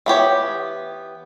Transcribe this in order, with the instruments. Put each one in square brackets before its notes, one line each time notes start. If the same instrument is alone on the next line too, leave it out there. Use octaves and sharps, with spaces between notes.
[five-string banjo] E3 B3 G4 C#5